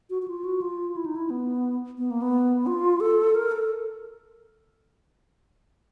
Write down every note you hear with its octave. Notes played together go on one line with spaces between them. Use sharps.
F#4
F#4
F4
F#4
F4
E4
D#4
E4
B3
B3
A#3
B3
F4
A4
A#4
A4